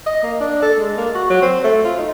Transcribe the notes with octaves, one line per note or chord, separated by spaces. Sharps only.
D#5
A#3
D4
A4
G#3
A#3
F#4
F#3
C4
A3
F4
D#4